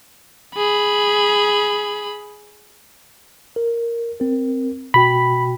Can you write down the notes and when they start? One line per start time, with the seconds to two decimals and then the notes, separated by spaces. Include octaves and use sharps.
0.56 G#4 B5
3.56 A#4
4.20 C4 A#4
4.94 B2 F#4 G5 B5